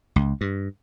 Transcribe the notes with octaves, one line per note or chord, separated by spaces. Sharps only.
C#2
G2